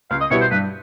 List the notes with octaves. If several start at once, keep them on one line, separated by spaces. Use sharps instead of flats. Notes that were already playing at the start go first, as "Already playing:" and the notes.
C#2 F5
D#5
B2 G3 B3 E4 C#5
C5
G2 B4